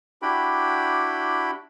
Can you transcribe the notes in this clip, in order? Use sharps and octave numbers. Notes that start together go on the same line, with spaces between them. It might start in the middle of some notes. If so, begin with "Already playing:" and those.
D4 E4 F#4 G4 G5 B5